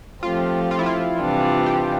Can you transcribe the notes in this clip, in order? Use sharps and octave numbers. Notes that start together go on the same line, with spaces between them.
F3 A3 C4 F4 G4
F4
E4
F4
C3 E3 G3 D4
G4